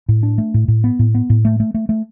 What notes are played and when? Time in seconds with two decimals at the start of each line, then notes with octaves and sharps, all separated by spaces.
0.09 A2
0.23 D4
0.38 A3
0.54 A2
0.68 A2
0.84 B3
0.99 A2
1.15 B3
1.30 A2
1.45 A3
1.60 A3
1.74 A3
1.89 A3